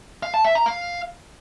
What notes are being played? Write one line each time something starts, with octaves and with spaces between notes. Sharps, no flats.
F5
A5
E5
A#5
F5